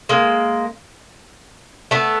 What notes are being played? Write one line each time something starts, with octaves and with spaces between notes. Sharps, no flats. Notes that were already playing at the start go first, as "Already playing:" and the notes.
G#3 A#3
A3 B3